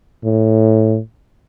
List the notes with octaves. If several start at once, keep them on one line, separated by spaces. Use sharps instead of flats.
A2